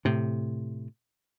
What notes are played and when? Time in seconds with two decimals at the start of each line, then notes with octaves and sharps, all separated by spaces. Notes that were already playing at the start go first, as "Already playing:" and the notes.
0.05 A2 C3